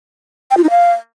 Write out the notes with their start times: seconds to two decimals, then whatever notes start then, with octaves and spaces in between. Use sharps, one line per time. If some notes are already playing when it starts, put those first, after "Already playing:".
0.51 G5
0.57 F4
0.64 D#4
0.70 F5